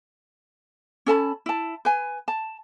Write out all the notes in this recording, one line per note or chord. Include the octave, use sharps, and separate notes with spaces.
C#4 A4 A5 B5
E4 A5
B4 G#5
A5